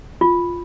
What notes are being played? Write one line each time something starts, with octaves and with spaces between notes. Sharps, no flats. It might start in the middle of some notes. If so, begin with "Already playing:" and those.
F4